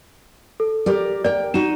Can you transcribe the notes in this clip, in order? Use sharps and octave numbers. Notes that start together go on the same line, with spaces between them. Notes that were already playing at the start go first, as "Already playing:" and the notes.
A4
G4 A#4 D5
A#4 D5 G5
D#4 F#4 E7